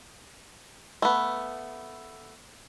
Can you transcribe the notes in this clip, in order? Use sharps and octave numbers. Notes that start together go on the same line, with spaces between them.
A3 B3